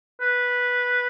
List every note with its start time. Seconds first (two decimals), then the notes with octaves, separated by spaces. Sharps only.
0.21 B4